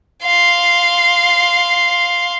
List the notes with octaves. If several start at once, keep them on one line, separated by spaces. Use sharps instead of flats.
F5 C6